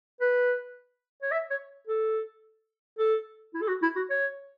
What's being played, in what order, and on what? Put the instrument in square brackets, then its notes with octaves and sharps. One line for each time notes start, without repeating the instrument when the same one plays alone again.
[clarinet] B4
C#5
E5
C#5
A4
A4
E4
A4
F#4
E4
F#4
C#5